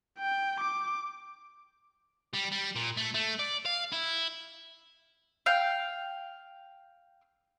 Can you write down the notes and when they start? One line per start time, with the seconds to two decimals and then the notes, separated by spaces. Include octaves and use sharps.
0.19 G5
0.60 D6
2.34 G3
2.52 G3
2.76 A#2
2.97 A3
3.14 A3
3.39 D5
3.65 F5
3.93 E4
5.46 F5 G5